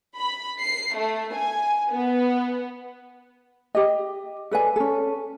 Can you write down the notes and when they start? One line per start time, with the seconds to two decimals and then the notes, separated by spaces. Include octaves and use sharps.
0.17 B5
0.62 C7
0.97 A3
1.36 G#5
1.90 B3
3.75 G4 D#5
4.51 A4 B4 D5 G#5
4.76 C#4 A4